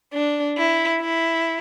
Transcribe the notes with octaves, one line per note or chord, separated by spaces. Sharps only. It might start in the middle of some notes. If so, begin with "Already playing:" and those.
D4
E4
E4